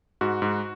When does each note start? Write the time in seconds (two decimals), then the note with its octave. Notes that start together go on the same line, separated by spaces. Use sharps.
0.21 G#2 F#4
0.42 G#2